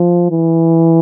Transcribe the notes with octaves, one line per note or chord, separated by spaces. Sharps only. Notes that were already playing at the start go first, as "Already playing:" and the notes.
Already playing: F3
E3